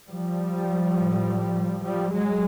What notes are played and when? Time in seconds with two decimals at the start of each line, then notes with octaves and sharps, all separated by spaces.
0.08 F3 G3
0.96 A2
1.83 F3 G3
2.11 F#3 G#3